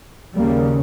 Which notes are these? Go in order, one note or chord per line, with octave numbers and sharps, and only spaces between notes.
D#2 C#3 G3 A#3